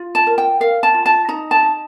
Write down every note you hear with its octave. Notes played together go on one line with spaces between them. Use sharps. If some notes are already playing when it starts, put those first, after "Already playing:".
Already playing: F4
A5
A#4
G5
A#4 F5
A5
F4
A5
D#4 A#5
A5
D#4